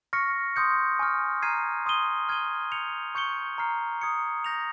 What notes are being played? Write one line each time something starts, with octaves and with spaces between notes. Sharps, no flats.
C#6 F6 A#6 C#7
C6 D#6 G6 C#7
G#5 C#6 F6
A#5 F6 G#6 C7 D#7
C6 D#6 G#6 D#7 G7
F6 G#6 D#7 G7
G6 C#7 F7
C#6 G6 C#7 G7
A#5 F6 C7
D#6 G#6 C#7
G6 A#6 F7